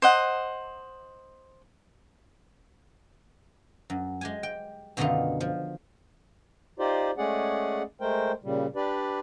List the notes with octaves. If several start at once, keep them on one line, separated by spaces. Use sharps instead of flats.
C5 D#5 F#5
F#2
G#3 G4 G#5
G5
F#2 B2 D3 D#3 D#4 F4
F3
D#4 F4 G4 C5 D5
G#3 A3 C#4 G#4 D5 F#5
G#3 A3 A#4 C5 G5
A#2 C#3 G3
D4 G4 B4 D5